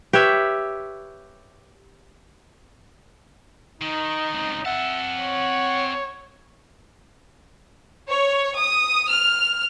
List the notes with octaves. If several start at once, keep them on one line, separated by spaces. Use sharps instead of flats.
G4 B4 C#5 E5
D#3 D#4
C#2 C3
C4 E5 F#5 A5
C#5
C#5
D#6
F6